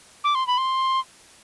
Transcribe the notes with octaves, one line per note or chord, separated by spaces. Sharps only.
D6
C6
B5
C6